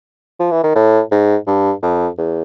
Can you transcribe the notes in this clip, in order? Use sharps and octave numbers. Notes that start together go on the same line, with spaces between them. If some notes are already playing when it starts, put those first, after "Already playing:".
F3
E3
D#3
A2
G#2
G2
F2
E2